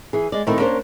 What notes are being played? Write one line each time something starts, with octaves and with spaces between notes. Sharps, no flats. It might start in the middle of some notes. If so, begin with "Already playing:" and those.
E3 G#4
G#3 D5
A#2 D#3 A3 C4 E4 A#4
A#3 C#4 D4 A#4 C5